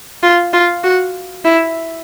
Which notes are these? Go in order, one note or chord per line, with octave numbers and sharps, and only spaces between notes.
F4
F4
F#4
E4